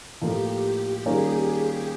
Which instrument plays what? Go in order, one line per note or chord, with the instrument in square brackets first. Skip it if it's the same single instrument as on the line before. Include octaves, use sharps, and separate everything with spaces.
[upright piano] A2 F3 A#3 [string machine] G4
[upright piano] D#3 G3 A#3 C#4 F4 [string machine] G#4